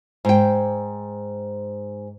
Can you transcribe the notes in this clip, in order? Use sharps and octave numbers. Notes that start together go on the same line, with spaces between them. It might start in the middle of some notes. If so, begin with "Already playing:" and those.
G#2 G5